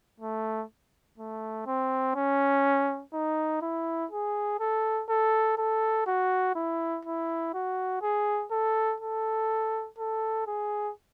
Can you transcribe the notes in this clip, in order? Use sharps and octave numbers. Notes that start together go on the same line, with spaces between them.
A3
A3
C4
C#4
D#4
E4
G#4
A4
A4
A4
F#4
E4
E4
F#4
G#4
A4
A4
A4
G#4